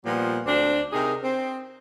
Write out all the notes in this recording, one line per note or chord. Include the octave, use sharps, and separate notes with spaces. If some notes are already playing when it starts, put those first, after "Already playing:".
A#2 F3 G3 B3
D2 C4 D4
C3 D#4 G#4 A#4
C4